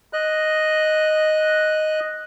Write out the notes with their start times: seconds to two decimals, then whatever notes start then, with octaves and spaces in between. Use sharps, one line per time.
0.13 D#5 F#6